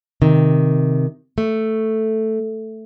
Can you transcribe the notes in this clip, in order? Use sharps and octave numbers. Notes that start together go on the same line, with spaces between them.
C3 D#3
A3